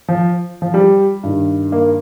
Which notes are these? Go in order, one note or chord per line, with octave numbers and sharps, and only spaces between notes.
F3
F3
G3
G2 D#3
A#3